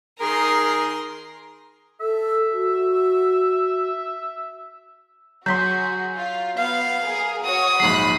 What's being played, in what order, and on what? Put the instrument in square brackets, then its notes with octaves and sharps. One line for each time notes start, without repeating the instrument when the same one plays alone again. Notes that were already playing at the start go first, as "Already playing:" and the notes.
[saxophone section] D#3 G#4 [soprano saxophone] A#4 [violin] A#5 C6
[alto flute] A4 [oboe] E5
[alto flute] F#4
[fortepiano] F#3 C6 [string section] F#4 G#4 [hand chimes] G6 B6
[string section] F4
[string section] B3 [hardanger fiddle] F5
[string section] G#4 A#4
[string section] F#4 C#5 [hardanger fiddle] D#6
[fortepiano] A#1 G#2 F#3 [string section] B5 F#6 [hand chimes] C7